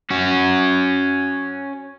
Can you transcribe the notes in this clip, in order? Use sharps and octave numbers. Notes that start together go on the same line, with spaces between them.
C#4 F#4